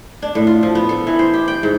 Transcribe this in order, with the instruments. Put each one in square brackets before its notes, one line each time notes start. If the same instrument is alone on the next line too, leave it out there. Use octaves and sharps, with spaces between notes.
[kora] D4
A2
F4
F3
B3
A4
E3
C5
G4
G5
G#2